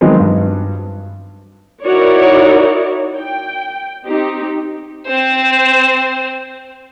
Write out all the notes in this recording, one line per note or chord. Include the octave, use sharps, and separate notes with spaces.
D#3 F3 F#3 G#3 B3 C4
G2
D#4 E4 F#4 A#4 C#5 D5
G5
C4 D#4 G4
C4 C5